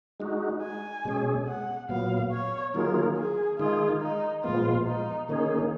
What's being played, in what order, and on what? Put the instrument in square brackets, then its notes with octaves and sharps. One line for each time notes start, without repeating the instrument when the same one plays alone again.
[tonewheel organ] G#3 D#4 F#4
[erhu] G#5
[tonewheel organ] B2 G#3 C#4 G#4
[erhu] F#5
[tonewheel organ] A#2 F#3 B3 [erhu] F5
[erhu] C#5
[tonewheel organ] D#3 F#3 A#3 F4 G#4 [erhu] A#4
[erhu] G#4
[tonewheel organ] D#3 G#3 D#4 G#4 [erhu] F4
[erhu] D#4
[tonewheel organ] A#2 F3 G#3 B3 [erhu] F4
[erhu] D#4
[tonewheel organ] D#3 A#3 C#4 G#4 [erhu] D#4